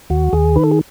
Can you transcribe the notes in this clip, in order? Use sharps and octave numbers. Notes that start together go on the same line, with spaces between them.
D#2 F#4
D#2 G#4
D#3 B4
A4
G#4